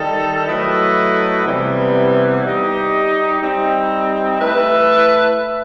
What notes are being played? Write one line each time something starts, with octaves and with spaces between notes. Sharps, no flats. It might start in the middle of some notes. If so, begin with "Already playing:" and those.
Already playing: D#3 G3 D#4 A4
F#3 A3 E4 B4 D#5
C3 E3 G3 B3
G3 D#4 G4 D#5
G3 C4 D#4
A3 E4 B4 E5